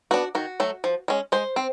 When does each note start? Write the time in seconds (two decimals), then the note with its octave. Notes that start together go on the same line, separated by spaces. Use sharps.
0.11 B3 D4 F#4
0.35 D#3 F#4
0.60 F#3 A3
0.84 F3
1.08 G#3 C#4
1.32 G#3 C5
1.56 C4